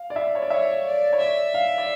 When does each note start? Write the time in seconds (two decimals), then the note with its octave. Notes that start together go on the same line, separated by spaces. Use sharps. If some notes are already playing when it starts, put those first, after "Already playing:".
Already playing: F5
0.10 D5
0.16 E5
0.35 C#5
0.42 D5
0.50 C#5 E5
0.85 D5
1.13 C#5
1.20 D5 E5
1.54 F5
1.78 D5